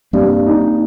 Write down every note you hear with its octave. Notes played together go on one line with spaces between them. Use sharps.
G2 A#3 C4
D#4